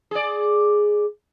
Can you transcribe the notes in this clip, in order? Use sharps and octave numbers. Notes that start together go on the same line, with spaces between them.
G#4 D5